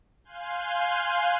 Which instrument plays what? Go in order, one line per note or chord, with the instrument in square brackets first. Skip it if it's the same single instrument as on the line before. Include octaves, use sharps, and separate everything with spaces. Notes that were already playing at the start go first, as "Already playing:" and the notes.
[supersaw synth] F5 G#5 C6 F#6 G6